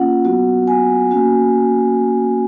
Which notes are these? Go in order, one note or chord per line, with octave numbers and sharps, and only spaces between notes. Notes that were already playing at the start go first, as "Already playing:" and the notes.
Already playing: A#3 C#4 F4 F#5
F#3 B3 F#4
G#5
A#3 C#4 F#4